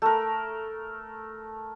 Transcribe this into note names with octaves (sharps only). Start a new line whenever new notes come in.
A3 A#4